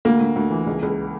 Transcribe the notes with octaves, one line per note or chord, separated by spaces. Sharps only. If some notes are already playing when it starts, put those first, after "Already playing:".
D2 A#3
D2
D2
E3
C#2
C#2